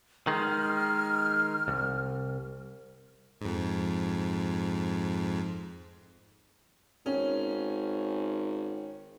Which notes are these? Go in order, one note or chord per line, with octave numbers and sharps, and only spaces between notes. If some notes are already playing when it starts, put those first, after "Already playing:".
D#3 G#3 F6
C2
F2 G#2
G#1 C#4